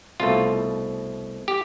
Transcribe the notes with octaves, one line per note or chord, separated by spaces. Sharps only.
C2 B2 A3 F4
G4